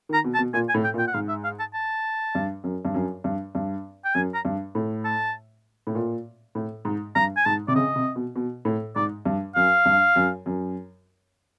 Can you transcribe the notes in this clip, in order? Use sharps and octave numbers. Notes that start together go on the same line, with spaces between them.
D#3
A#5
B2
A5
B2
A#2 G#5
G#5
A2
G5
A#2
G5
F#5
G#2 F5
E5
F5
A5
A5
G2
F#2
G2
F#2
G2
G2
G5
F#2 G#5
A#5
G2
A2
A5
A2
A#2
A2
G#2
G2 A#5
G#5
G#2 A5
C3 D5
C#3 D#5
C3
B2
B2
A2
G#2 D5
G2
F#2 F5
G2
F#2
F#2